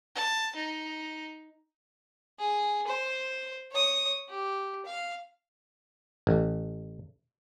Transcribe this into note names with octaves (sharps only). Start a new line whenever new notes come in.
A5
D#4
G#4
C5
C#5 D#6
G4
F5
A1